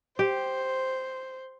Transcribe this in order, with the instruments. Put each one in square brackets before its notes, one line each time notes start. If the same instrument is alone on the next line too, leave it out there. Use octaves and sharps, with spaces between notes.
[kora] G4 [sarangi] C5